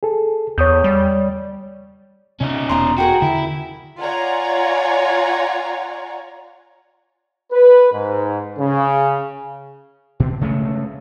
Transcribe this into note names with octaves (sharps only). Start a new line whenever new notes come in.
G#4 A4
E2 C#5 D#6 G6
G3
C3 C#4 D#4
E1 B3 D#5 A#5 C6
F#4 G#4 A#4 G5
D3 E4
F4 C#5 D5 F#5 G#5 A#5
B4
G#2
C#3
B2
C#3 G#3 A3